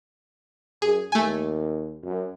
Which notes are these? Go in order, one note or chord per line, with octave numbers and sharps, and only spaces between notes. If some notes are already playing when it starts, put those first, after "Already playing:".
F#2 G#4
D#2 A3 G#5
F#2